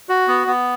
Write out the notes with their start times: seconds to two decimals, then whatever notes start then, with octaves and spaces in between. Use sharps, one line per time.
0.09 F#4
0.28 B3
0.47 B3